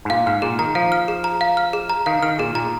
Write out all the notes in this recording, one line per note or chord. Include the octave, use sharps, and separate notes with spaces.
G#2
A#2 F5
G#2 F6
A#2 G#4
D#3 A#5
F3 F5
F6
G#4
A#5
F5
F6
G#4
A#5
D#3 F5
D#3 F6
A#2 G#4
A#2 A#5